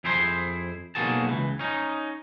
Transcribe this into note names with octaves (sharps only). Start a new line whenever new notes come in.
F2 E4 G#4 C5 A#5 C6
B1 F2 A#3 F#4 G#4 A5
C#2 E3
C#4 D#4